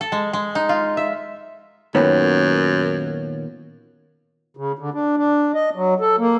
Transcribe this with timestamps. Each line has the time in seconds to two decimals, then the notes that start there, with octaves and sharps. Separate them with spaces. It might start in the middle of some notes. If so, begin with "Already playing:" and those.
0.01 A4
0.12 G#3
0.33 G#3
0.55 D#4
0.69 F4
0.97 E5
1.95 F#2 A#2 D#3 B3 C#5
4.57 C#3
4.79 D3
4.94 D4
5.17 D4
5.54 D#5
5.76 F#3
6.00 A4
6.19 A#3